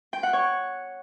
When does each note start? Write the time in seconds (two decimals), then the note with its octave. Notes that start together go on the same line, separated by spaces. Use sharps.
0.13 G5
0.23 F#5
0.33 C#5